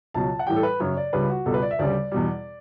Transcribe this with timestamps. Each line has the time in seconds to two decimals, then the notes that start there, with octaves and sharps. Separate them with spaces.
0.14 C#2 B2 F#3 A5
0.39 F#5
0.47 A2 E3 G3 G5
0.56 A4
0.63 B4
0.80 F#2 C#3 F#3 C#5
0.97 D5
1.13 C#2 C#3 G3 B4
1.30 F#4
1.46 C#2 B2 G3 A4
1.54 B4
1.62 D5
1.71 E5
1.79 D2 C#3 G3 D5
2.12 E2 B2 G3